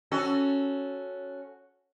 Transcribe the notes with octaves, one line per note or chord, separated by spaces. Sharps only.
C#4 F#4 A4